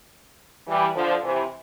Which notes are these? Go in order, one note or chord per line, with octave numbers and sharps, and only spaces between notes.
E3 G3
D3 F3
C3 E3